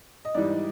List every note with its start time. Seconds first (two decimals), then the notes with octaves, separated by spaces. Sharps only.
0.25 D#5
0.34 G#2 E3 G3 D5